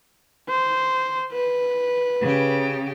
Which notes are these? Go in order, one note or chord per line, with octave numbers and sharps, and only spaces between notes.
C5
B4
C#3 G4